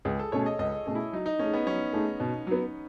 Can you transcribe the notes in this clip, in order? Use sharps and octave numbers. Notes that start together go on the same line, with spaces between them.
C#2 G#4
A4
B2 A3 C#4 G#4 C#5
D#5
C#2 D#5
B2 A3 C#4 G#4
E4
F#3 D#4
D#4
A3 C#4 D#4 G#4
B3
F#3 C#4
A3 D#4 G#4
B2
F#3 B3